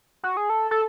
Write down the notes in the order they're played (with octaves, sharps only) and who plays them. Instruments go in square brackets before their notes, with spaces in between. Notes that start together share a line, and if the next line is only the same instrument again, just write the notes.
[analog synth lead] F#4
G#4
A4
A4